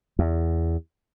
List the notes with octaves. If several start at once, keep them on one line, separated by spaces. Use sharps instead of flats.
E2